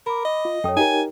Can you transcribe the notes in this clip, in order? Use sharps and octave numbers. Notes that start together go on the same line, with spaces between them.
A#4 B5 D6
D#5
F4
F#2 A4 C#5 G5 D#6
D#4 G4 A#4 G#5